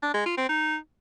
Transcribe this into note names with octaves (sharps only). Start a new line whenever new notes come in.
D4
G#3
F4
C4
D#4